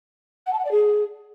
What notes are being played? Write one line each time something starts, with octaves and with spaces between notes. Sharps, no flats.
F#5
A5
F#5
D5
G#4